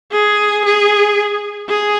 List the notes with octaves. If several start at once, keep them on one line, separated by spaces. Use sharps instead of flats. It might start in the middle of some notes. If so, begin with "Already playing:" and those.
G#4
G#4
G#4